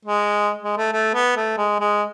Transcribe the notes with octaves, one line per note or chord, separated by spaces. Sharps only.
G#3
G#3
A3
A3
B3
A3
G#3
G#3